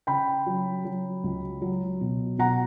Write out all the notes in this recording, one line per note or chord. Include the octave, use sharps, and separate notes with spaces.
C#3 G5 B5
F#3
F#3
C#2
F#3
B2
B2 F#5 A#5